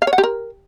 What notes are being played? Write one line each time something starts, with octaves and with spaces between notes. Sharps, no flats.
F5
C#5
F#5
G4
A#4